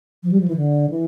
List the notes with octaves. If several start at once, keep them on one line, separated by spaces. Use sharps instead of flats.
F3
G3
F3
E3
D3
E3